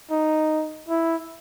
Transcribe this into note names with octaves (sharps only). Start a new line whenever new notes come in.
D#4
E4